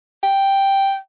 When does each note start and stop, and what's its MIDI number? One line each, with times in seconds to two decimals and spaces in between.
0.23 0.97 79